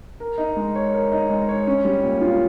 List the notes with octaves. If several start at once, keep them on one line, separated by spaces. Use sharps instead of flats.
A#4
D#4
G#3
C#5
A#4
D#4
G#3
C#5
C#4
G3
A#2
F4